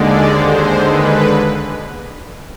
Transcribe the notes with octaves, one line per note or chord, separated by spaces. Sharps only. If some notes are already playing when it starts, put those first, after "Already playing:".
Already playing: D#2 D3 G#3 D5
C5
B4